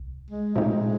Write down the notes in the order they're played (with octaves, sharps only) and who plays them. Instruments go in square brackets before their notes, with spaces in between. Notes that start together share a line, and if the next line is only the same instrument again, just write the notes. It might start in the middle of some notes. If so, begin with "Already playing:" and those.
Already playing: [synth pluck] C2
[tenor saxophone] G#3
[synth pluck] A#2 F3 A3 C4 D#4 [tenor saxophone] G#3